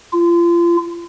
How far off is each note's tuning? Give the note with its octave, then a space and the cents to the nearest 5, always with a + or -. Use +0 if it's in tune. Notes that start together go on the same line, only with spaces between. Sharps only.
F4 -30